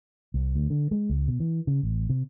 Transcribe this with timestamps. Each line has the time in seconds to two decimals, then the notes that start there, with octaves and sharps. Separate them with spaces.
0.34 C2
0.55 D2
0.70 D3
0.91 G#3
1.09 C#2
1.28 B2
1.40 E3
1.67 C#3
1.83 A1
2.10 C3